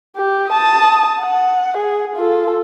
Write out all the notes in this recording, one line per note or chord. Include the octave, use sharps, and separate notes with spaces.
G4
A5 D#6
F#5
G#4
F4 A4